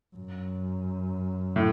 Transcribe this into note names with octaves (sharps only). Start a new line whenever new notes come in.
F#2
A2